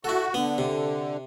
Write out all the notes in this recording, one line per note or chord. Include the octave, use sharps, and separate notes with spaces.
E4 F#4 A4
D3 B3
C3